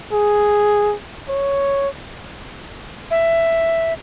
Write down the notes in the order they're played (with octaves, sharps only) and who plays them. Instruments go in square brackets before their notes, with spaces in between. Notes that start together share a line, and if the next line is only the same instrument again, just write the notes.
[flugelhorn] G#4
C#5
[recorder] E5